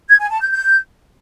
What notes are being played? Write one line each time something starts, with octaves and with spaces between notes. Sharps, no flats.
G#6
G#5
A5
G6
G6